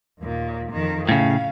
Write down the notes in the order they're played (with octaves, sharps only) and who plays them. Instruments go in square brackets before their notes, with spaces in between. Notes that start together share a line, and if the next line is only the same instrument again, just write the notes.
[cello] D#2 A#2
F2 D#3
[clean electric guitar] A2 C#3 [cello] F5